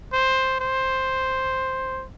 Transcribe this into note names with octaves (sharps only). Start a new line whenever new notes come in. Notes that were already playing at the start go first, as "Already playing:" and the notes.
C5
C5